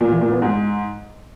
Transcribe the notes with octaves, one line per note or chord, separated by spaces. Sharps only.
A#2
E3
A#2
B3
G#2